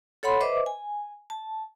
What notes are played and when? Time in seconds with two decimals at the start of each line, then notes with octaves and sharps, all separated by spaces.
0.23 A4 C#5 F#5 B5 C6
0.40 B4 C5 D#5 E5 D6
0.66 G#5
1.30 A5